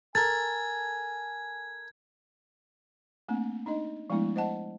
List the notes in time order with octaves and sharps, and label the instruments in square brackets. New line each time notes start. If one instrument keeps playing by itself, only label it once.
[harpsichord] A4 A#4 [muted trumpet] G#5 [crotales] G#6 [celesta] A6
[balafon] A3 A#3 C4 D4
D4 D#4 D#5
F3 G#3 A3 B3 D4 E4
C5 D#5 F#5 A5